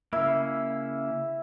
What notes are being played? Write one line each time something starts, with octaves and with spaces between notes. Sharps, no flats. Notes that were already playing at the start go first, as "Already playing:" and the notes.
C#3 A#3 E4